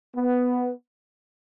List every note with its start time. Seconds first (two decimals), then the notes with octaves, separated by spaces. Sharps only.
0.15 B3